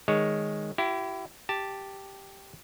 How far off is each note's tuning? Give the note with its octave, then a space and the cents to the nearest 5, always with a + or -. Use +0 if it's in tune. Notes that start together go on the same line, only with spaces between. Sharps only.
D#3 +0 G#3 +0 C#5 +0
E4 +25 G4 -35
G4 +0 A5 +0